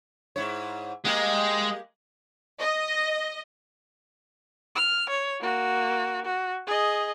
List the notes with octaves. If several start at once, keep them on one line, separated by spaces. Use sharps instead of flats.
G#2 E4 C#5
G#3 A#3 G4
D#5
F6
C#5
A#3 F#4
F#4
G#4 D#5